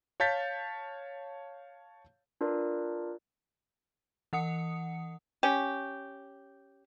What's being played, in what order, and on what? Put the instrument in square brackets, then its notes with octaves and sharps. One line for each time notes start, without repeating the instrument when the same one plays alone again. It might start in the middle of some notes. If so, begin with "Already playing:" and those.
[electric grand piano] C#5 F5 A5 G6 A6 B6
[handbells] D4 F4 A#4 B4 D5
[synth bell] E3 F#5 D#6 C#7
[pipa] C#4 G4